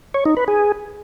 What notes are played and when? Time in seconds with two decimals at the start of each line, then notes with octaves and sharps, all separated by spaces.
0.14 C#5
0.26 D#4
0.37 B4
0.48 G#4